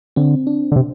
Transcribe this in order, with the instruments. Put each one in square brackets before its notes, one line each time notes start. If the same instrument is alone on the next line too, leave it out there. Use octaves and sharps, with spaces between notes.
[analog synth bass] D3 [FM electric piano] C4
[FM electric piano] D4
[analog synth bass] D3
C3